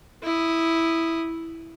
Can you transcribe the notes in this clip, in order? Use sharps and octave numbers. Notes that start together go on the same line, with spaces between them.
E4 D#6